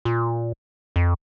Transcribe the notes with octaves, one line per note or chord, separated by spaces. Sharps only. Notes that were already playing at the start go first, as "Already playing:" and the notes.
A#2
F2